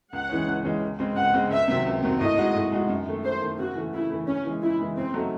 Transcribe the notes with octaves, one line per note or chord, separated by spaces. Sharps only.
C#2 F#5
C#3 E3 G#3 C#4
C#2
C#3 E3 G#3 C#4
C#2
C#3 G#3 C4
C#2 F#5
C#3 G#3 C4
C#2 E5
C3 D#3 F#3 C4
C#2
C3 D#3 F#3 C4
A2 D#5
G#3 D#4 F#4
A2
G#3 D#4 F#4
F#2
D#3 A3
F#2 C5
D#3 A3
C#3 F#4
E3 A3
C#3 E4
E3 A3
C#3 C#4
E3 G#3
C#3 E4
E3 G#3
C#3 C4
F#3 A3 D#4